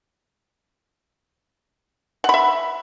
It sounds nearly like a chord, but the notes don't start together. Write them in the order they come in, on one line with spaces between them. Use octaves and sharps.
F#5 B5 E5